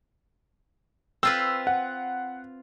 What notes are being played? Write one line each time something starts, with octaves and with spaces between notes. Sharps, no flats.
C4 F4 B4 E6
F#5